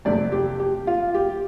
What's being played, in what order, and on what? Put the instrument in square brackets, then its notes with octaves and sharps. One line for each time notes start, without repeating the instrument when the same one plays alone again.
[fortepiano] F2 C3 A3 D5
G4
G4
F4
G4